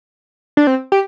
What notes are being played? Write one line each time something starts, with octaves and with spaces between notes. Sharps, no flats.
D4
C4
G4